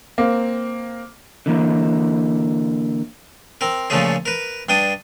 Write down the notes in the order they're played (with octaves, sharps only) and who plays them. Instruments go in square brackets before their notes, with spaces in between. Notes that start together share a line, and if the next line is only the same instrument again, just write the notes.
[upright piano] A#3 C4
[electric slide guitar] D3 E3 A#3
[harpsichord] C4 A#4
A#2 C#3 F3 A3 C#4 G#4
A#4 B4
G2 D4 G5 D#6